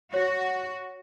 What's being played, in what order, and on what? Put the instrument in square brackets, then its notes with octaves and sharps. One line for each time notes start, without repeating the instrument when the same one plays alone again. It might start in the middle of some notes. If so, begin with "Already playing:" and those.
[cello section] F#4 [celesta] C#5